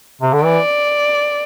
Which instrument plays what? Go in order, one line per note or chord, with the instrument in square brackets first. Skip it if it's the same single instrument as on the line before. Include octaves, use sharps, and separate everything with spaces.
[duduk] C3
D3
[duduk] E3 [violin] D5